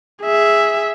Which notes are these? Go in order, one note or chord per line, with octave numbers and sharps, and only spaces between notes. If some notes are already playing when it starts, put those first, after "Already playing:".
G#4 E5